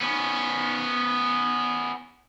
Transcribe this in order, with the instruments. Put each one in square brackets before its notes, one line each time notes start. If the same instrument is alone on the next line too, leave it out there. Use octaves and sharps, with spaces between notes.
[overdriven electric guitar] B3 C#4